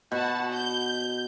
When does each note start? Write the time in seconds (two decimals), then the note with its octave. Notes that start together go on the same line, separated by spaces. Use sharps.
0.12 B2 F#4 F#5 A5
0.52 G6